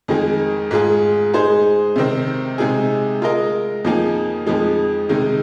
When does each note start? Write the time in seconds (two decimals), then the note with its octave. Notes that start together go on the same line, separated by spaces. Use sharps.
0.08 F2 D#3 G#3 D#4 G#4
0.71 G#2 G#3 F4 G#4
1.34 G#3 D#4 G#4 C5
1.96 C3 D#3 C4
2.58 C3 G#3 D#4 G#4
3.22 G#3 F4 A#4 D#5
3.84 F2 F3 A#3 D#4 G#4
4.47 F2 F3 G#3 D#4
5.09 C3 D#3 G#3 D#4